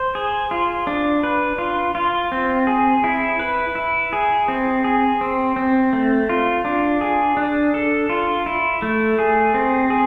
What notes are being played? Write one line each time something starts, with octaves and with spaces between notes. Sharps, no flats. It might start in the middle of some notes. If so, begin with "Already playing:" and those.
Already playing: C5
G#4
F4
D4
B4
F4
F4
C4
G#4
E4
B4
E4
G#4
C4
G#4
C4
C4
A3
F4
D4
G#4
D4
A4
F4
E4
A3
G#4
C4
G#4